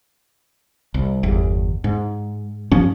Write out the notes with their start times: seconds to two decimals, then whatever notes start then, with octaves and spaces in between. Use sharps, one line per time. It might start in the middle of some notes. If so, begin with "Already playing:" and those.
0.94 C2
1.23 G1 E2
1.84 G#2
2.72 G2 F3 C#4